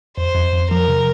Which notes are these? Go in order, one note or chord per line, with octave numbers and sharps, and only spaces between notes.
F2 C5
F2
F2
F3 A#4
C3